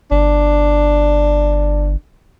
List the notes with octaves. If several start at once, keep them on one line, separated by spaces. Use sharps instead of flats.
G1 D4